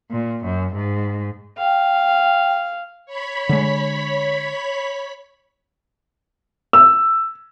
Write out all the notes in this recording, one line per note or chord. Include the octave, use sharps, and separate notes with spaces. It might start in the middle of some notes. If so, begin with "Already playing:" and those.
A#2
F#2
G#2
F5 G5
C#5 B5 B6
D3 G#3
E6